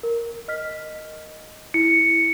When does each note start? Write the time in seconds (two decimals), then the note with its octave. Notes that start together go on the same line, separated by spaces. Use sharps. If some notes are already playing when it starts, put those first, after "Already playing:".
0.03 A#4
0.48 D#5 F6 B6
1.74 E4 C#7